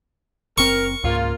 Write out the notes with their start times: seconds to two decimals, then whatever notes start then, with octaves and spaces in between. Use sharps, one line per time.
0.58 F#1 C4 A#4 C#6
1.04 C#2 G#2 A#3 F4